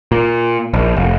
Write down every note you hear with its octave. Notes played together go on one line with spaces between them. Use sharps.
A#2
A#1
F1